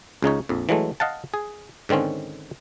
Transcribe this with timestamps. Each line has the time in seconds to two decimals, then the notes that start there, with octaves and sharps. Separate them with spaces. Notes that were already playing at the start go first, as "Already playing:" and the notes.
0.22 C#2 C#3 D#4 C#5
0.49 A#1 F2
0.69 E3 F#3 G#3 A3
1.00 D#5 F5 F#5 A5
1.34 G#4
1.89 G#2 D3 D#3 C4 C#4